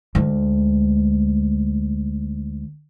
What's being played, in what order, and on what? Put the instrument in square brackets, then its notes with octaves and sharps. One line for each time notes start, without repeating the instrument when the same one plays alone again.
[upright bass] D2 G#3